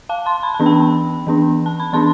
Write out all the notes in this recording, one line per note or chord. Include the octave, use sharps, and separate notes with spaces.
F5 A5
A5 C6
B5
A5
E3 B3 D4
G5 B5
E3 B3 D4
A5
B5
E3 B3 D4 A5 C6